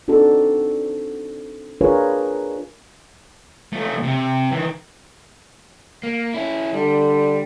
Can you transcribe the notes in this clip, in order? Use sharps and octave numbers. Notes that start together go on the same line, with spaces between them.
C4 D4 D#4 F#4 A4
D4 F4 G#4 A#4 B4 C#5
F3 A3
C3
D#3 E3
A#3
C#4 E4
D3 G3